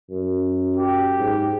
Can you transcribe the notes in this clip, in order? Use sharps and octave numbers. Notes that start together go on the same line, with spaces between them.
F#2
G4
G#2